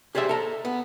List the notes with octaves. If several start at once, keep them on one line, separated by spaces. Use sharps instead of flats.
G4 G#4 C5 D5 E5
A4 A#5
B3